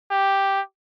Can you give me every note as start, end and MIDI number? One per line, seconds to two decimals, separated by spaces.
0.11 0.61 67